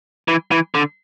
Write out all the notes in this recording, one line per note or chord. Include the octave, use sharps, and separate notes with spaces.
E3
E3
D3